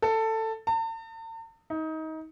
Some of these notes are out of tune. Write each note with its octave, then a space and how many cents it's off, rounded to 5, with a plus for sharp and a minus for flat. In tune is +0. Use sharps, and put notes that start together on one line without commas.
A4 +15
A5 +45
D#4 +25